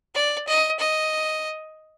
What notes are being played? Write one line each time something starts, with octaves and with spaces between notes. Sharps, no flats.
D5
D#5
D#5